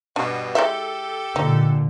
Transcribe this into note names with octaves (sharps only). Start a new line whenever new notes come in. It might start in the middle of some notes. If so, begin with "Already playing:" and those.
G2 B2 D4
G#3 E4 G4 A4 E5
A#2 D3 D#4